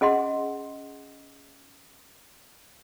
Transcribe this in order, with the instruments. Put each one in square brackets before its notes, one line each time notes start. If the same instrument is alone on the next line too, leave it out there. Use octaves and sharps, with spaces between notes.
[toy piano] C#4 G#4 D#5 F#5 C6